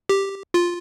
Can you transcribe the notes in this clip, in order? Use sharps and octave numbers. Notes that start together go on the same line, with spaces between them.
G4
F4